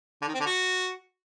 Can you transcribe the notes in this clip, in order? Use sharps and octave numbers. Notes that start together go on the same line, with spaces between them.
D3
D#3
C4
D3
F#4